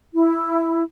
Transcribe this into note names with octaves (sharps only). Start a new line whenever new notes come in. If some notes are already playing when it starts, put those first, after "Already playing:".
E4